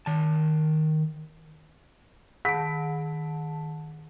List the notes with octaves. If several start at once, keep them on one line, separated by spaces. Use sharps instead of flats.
D#3 A5
D#3 A5 B6